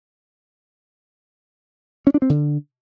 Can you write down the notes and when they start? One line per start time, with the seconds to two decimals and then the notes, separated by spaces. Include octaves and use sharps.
2.07 C#4
2.14 D4
2.22 C4
2.30 D3